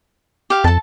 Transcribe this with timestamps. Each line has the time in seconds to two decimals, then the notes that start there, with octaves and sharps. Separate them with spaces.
0.50 G4 F5
0.64 F2 A4 A5